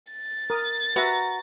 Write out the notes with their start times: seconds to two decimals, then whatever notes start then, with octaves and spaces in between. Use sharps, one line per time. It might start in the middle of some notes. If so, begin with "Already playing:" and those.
0.13 A6
0.50 A#4 D#6
0.96 F#4 B4 E5 A#5